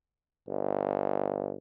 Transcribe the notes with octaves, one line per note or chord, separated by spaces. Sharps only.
G1